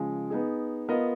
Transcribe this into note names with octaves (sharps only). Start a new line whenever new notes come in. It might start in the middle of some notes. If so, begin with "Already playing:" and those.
Already playing: C#3 F3 G#3
B3 D#4 G#4
B3 F4 A#4 D#5